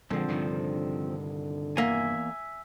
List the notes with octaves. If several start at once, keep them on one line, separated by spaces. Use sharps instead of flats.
A#1 D3 F3 G#3 C4
G2 C3 D#3
E2 A#3 E5 G#5